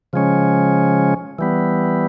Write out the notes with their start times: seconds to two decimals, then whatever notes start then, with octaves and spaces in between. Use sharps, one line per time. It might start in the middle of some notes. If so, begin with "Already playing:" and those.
0.13 C#3 F3 G#3 C#4
1.39 E3 G3 B3